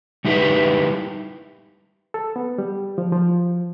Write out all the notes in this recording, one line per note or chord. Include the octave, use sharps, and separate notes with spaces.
G3 D#4 E4 G4 B4
A4
B3
G3
F3
F3